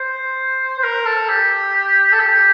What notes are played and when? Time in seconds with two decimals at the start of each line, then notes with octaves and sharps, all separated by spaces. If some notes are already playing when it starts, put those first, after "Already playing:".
Already playing: C5
0.79 C5
0.84 A#4
1.06 A4
1.29 G4
2.12 A4
2.20 G4